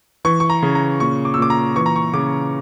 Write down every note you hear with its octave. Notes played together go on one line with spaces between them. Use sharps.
E3 C#6
C#6
A#5
C#3
A#5
A#2 C#6
D6
E6
A#2 D6
A#5
E3 C#6
A#5
C#6
C#3 D6